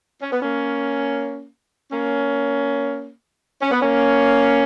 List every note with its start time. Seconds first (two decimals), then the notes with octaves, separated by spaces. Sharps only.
0.22 C#4
0.33 B3
0.42 A#3 C#4
1.92 A#3 C#4
3.61 C#4
3.72 B3
3.82 A#3 C#4